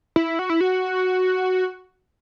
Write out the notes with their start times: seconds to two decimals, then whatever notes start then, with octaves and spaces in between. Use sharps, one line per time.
0.16 E4
0.39 F#4
0.50 E4
0.61 F#4